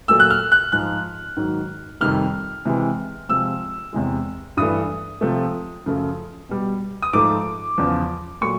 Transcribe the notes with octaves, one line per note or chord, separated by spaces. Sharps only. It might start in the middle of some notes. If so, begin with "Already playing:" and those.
A#2 F#3 A3 E6
F#6
F6
F#6
G#2 F3 G#3 F#6
G#2 D#3 F#3
F2 C3 D#3 G3 F6
C3 E3 G#3
C3 F3 G#3 E6
E2 C3 E3 G#3
G2 E3 A3 D#6
C3 F3 A3
F#2 C#3 F3 A3
B2 G3
D#6
G#2 F3 A3 D6
E2 C#3 F3
A#2 F#3 A3 C#6